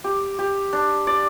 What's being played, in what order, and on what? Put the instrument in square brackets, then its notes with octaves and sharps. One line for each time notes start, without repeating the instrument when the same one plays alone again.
[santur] G4
G4
D4
D5